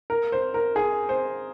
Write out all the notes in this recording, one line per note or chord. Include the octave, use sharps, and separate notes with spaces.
A#4
C5
A#4
G#4
C5